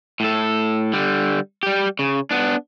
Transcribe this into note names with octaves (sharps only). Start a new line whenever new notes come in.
A2 A4
D3 G3
G3 G4
C#3
B3 D4